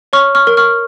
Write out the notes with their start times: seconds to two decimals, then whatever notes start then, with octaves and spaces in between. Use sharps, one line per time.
0.13 C#5 C#6 F6
0.35 C#6 F6
0.47 A#4
0.57 C#6 F6